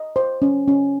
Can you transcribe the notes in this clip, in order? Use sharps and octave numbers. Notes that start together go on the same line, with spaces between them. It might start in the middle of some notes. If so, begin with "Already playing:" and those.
Already playing: D#5
C5
C#4
C#4